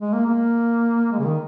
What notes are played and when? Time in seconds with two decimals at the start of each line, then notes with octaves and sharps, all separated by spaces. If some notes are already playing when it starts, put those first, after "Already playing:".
0.01 G#3
0.13 A#3
0.26 A#3
1.12 G#3
1.19 C#3
1.24 D#3